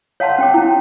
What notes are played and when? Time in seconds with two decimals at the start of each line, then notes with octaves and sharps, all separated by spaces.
0.20 C#5 F5 F#5 A5 C6
0.38 C#4 G5 D6
0.54 C#4 E4